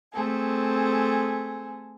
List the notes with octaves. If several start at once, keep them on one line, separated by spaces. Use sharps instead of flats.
A3 C4 G#4 A4